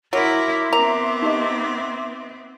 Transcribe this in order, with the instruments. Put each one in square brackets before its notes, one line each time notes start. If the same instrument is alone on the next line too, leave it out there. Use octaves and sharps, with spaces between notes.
[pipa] F#3 [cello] E4 A#4 [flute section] E5 C6 D6
[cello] B3 C4 [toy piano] A#4 [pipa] A#5
[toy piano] D#4 G4 D#5